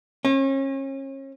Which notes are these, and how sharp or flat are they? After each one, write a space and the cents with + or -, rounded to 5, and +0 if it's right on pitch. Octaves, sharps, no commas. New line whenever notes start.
C#4 -35